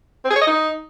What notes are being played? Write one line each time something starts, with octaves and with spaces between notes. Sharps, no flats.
C4
G#4
C#5
D#5
D#4